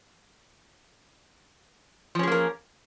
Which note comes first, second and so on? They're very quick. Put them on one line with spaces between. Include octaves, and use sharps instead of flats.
F3 C#4 G#4 A#3 A#4